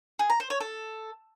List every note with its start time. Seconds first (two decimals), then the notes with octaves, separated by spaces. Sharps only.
0.19 G#4
0.30 A#5
0.40 C5
0.50 C#5
0.60 A4